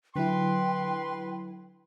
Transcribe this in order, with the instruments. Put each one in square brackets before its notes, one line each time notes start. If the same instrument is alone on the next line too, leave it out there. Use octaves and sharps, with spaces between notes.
[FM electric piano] D3 F#3 E4 [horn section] B4 C6 [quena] G5